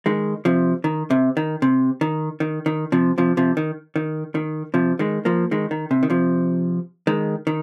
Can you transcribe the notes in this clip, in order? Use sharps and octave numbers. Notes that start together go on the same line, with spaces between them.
D#3 G#3
C3 F3
D#3
C3
D#3
C3
D#3
D#3
D#3
C3 F3
C3 F3
C3 F3
D#3
D#3
D#3
C3 F3
D#3 G#3
F3 A#3
D#3 G#3
D#3
C3
D#3
C3 F3
D#3 G#3
D#3